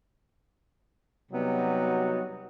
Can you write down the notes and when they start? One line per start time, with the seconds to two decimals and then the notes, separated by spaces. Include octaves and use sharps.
1.32 C3 F#3 G3 B3 D#4 F#4